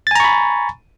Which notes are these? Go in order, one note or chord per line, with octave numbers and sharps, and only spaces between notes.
G#5 A#5 B5 C#6 A6